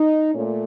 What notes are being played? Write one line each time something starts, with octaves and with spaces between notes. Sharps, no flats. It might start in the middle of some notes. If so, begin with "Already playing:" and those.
Already playing: D#4
A#2 A3 C#4